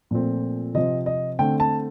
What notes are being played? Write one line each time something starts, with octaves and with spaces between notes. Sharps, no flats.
A#2 F3 A3 C4
C3 F3 C4 D#5
D#5
D3 A3 C4 G5
A5